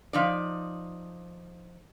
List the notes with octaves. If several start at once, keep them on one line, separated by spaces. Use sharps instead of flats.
F3 D#4 D5